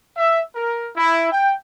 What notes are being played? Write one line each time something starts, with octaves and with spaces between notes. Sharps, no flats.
E5
A#4
E4
G5